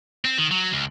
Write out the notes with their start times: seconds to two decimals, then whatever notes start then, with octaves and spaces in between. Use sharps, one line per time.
0.25 C4
0.38 D#3
0.51 F#3
0.73 C#2